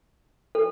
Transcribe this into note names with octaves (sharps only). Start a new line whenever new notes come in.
A4